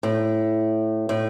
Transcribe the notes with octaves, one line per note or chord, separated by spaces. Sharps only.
A2
A2